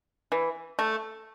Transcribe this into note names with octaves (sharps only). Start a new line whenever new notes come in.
E3
A3